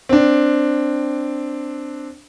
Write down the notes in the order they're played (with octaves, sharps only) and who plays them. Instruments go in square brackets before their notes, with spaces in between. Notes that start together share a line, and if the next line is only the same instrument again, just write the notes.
[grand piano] C4 D4